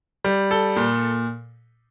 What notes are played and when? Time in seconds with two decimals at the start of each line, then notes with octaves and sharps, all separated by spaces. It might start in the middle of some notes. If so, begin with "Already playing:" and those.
0.25 G3
0.51 A4
0.76 A#2